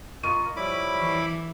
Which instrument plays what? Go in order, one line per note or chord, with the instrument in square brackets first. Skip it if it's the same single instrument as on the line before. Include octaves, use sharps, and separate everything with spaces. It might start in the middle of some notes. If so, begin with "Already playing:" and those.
[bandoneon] F4 A#4 D#5 [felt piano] C#6 D#7
[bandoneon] F3 G3 C#5 [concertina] E4 B5 D6
[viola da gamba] E3